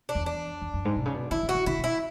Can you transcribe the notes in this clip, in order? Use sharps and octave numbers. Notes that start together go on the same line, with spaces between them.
D4
E2
D4
E2
F#2
G#2
B2
C#3
B2
E3 E4
D3
F#4
E3
D3 E4
B2
E4